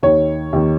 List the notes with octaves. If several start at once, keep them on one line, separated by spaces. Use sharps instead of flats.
D#2 D#3 C#5
D#2 D#3